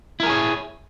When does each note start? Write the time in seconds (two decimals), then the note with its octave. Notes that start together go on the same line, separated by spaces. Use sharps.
0.20 E4
0.23 A#4
0.26 G#4
0.30 C#5